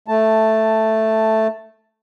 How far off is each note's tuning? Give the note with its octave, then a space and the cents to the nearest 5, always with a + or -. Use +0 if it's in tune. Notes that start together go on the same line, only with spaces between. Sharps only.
A3 +0 A5 +5